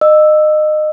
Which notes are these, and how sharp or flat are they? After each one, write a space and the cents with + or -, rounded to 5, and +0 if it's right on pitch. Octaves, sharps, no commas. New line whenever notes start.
D#5 -25 E6 +0